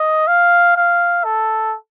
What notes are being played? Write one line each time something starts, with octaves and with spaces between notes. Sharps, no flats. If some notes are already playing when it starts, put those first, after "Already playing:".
Already playing: D#5
F5
F5
A4